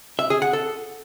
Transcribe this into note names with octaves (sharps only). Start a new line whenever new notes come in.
E5
G#4
F#5
A4